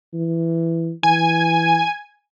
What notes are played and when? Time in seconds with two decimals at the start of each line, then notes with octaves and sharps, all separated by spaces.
0.14 E3
1.03 E3 G#5